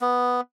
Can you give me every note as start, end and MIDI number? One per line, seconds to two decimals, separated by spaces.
0.01 0.41 59